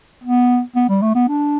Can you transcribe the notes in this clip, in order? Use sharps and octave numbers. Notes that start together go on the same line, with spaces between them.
B3
B3
G3
A3
B3
D4